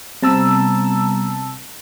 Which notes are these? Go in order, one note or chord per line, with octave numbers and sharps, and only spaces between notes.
C3 G3 B3 A5 A#5 E6